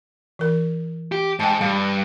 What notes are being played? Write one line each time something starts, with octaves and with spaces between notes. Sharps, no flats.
E3 A#4
G4
G#2 G5 A5
G2 F5